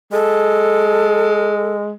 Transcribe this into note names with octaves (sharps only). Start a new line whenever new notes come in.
G#3 A4